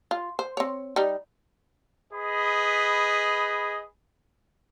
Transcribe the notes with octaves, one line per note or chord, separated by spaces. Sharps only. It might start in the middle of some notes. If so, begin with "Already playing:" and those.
F4
C5
C4 C#5
G3 D#4
G#4 B4 D#5 B5